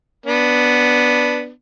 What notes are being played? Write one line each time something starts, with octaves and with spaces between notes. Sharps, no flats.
B3 D4